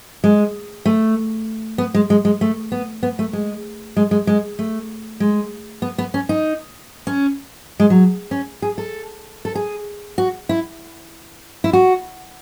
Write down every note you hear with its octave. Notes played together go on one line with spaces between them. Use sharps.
G#3
A3
B3
G#3
G#3
G#3
A3
B3
B3
A3
G#3
G#3
G#3
G#3
A3
G#3
B3
B3
C#4
D#4
C#4
G#3
F#3
C#4
G#4
A4
A4
G#4
F#4
E4
E4
F#4